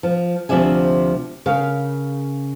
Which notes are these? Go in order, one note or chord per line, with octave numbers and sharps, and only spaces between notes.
F3
D2 C3 F3 D5 E5 G#5
C#3 A#4 F5